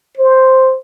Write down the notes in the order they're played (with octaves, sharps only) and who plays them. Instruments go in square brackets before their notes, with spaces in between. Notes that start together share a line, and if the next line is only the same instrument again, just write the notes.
[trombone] C5